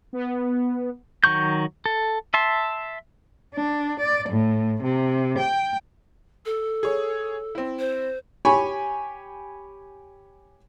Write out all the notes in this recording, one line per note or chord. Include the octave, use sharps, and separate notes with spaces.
B3
D#3 F#3 C#6 G6
A4
E5 A5 C6
D4
D5
A2
C3
G5
A4
G#4 C#5
C4 E4
C5
G4 C#5 G#5 B5 C#6